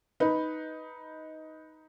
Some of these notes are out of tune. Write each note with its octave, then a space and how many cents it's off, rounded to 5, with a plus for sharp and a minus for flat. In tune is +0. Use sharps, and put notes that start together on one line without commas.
D#4 +10 B4 +0